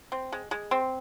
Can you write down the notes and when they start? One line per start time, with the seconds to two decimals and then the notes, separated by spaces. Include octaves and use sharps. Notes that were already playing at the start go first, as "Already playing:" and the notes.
0.12 C4
0.32 G#3
0.51 G#3
0.71 C4